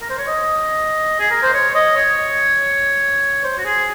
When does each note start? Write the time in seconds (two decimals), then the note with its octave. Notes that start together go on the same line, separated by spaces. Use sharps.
0.01 A#4
0.10 C5
0.18 C#5
0.27 D#5
1.20 G#4
1.30 A#4
1.42 C5
1.54 C#5
1.75 D#5
1.96 C#5
3.44 C5
3.58 F#4
3.65 G#4